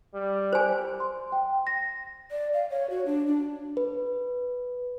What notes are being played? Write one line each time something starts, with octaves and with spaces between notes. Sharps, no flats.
G3
C5 G#5
C6
G5
A#6
D5
F5
C#5
F#4
D4
D4
B4